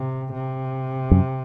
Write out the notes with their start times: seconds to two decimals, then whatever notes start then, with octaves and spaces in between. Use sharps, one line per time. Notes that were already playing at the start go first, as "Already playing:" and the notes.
Already playing: C3
0.33 C3
1.11 F#2